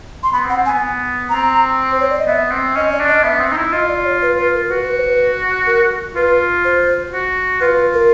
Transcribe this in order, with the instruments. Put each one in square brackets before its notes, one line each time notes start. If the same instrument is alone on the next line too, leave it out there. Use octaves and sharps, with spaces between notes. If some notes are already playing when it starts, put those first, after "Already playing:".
[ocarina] C6
[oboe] B3 [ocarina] B5
[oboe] C4
[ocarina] F#5
[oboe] C4
[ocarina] G#5
[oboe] B3
[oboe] C4 [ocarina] A#5
[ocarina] C5
C#5
D5
D#5
[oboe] B3 [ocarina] E5
[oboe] C4
[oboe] C#4 [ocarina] D#5
[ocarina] D5
[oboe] D4
[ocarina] D#5
[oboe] B3 [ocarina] E5
[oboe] C4
D#4
E4
[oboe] F4 [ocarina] D#5
[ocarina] D5
C#5
B4
B4
A#4
[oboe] F#4 [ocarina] B4
[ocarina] B4
C5
B4
A#4
[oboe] F4 [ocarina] B4
[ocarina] C5
[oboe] F#4
[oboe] F4 [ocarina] B4
[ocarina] B4
A#4